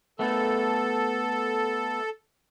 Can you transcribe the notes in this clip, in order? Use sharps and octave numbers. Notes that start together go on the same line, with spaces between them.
A3 B3 A4